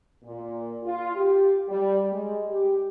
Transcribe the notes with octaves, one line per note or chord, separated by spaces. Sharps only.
A#2
F4
G4
G3
G#3
G4